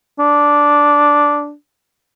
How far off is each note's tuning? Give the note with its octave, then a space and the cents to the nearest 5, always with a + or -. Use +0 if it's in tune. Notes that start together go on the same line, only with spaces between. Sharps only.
D4 -5